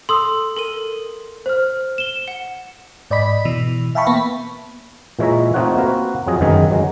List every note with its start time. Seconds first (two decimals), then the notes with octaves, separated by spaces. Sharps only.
0.09 A4 C6 D#6 E6
0.57 A4 A#4 D#7
1.46 C5 F6
1.98 E7 G7
2.28 F#5
3.11 G#2 D5 D#5 B5 B6
3.45 B2 E3
3.95 E5 F5 G5 A5 B5 C#6
4.07 A#3 B3 B5
5.19 A#2 E3 G#3 C#5 E5 A#5
5.54 A3 C4 D#4 F4 C#5 F#5
5.77 A#3 C4 F#4 A#4 B4
6.26 F2 F#3 F4 G#4 D#5
6.41 G1 F#2 D#3 G#3 B3 G#4
6.71 F#3 G#3